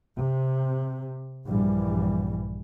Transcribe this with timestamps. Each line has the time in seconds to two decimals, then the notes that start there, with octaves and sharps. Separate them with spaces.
0.17 C3
1.46 A#1 G2 E3 G3